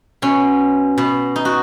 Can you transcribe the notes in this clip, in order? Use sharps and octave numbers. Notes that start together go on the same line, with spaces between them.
B2 C#4
B2
D#4
F#4